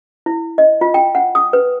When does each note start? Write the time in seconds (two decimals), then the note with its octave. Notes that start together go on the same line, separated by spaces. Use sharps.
0.26 E4
0.58 D#5
0.81 F4
0.94 G5
1.15 F#5
1.35 D#6
1.53 B4